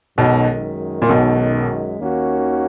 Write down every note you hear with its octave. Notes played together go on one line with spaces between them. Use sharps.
B1 F#2 B2 D#3 G#3
A#2
B1 B2
D#2 D#3 A#3 C#4 F#4